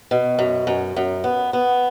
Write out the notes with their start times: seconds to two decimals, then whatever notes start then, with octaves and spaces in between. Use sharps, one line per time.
0.11 B2
0.39 F#2
0.67 F#2
0.96 F#2
1.24 B3
1.53 B3